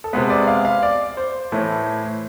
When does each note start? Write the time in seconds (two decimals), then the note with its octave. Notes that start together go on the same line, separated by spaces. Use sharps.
0.04 A4
0.13 C3 G#3 B3 B4
0.30 D5
0.48 F5
0.65 F5
0.83 D5
1.17 C5
1.52 A2 E3 A3